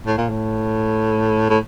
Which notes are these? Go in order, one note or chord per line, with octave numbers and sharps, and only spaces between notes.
A2
A#2
A2
A2